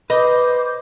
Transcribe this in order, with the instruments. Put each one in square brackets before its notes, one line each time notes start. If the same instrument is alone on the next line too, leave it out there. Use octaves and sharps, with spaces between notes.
[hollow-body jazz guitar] B4 [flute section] C5 D6 G6 [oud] D#5